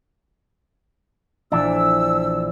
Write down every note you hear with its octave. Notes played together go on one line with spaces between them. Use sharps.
A#1 E3 A3 D4 E6